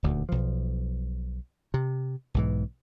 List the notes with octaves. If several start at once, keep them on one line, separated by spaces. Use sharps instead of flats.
D#1 D2
B1 F3
C3
B1 G#2 E3